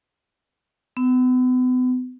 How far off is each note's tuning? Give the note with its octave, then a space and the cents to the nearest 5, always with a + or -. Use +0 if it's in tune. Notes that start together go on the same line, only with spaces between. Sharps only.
B3 +40